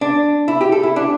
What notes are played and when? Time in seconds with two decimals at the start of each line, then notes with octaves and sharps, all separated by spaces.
0.01 D4
0.48 E4
0.61 G4
0.72 A4
0.83 E4
0.96 D4